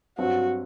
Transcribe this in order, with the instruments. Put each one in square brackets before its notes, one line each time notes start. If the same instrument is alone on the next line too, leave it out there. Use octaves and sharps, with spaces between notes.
[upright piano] G2 F#3 C4 [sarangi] F#4